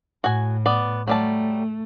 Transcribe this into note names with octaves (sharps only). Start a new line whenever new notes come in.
A2 F#4 G#5
B3 D5
F#3 G3 A3 A5